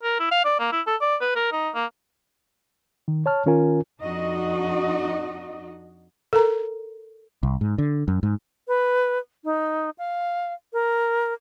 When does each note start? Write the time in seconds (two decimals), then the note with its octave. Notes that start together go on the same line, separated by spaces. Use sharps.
0.03 A#4
0.20 E4
0.31 F5
0.45 D5
0.59 A#3
0.72 E4
0.87 A4
1.01 D5
1.21 B4
1.35 A#4
1.52 D#4
1.75 A#3
3.08 D#3
3.26 C#5 A5 F6
3.46 D#3 C#4 F4 A#4 G#5
4.01 F2 D4 D#4 F#4 D#5
6.33 A4 A#4 A#5
7.43 C2
7.61 G#2
7.78 D3
8.08 F#2
8.23 G#2
8.68 B4
9.45 D#4
9.98 F5
10.73 A#4